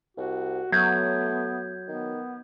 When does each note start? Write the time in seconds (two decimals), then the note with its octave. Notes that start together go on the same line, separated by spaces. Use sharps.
0.17 C2 F#4
0.72 F#3 A3 B3 G6 G#6
1.88 D#3 B3